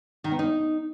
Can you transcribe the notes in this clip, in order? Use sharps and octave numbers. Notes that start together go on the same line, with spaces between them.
D#3
B3
D#4